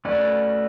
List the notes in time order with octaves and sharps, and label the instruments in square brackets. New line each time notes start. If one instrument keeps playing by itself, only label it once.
[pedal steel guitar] A3 C#4 F#4 B4 [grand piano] D5